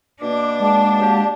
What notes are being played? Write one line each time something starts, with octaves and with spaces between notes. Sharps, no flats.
B2 A#3 D4 D6
G#3 D5 F#5 A5
F#3 A#3 G4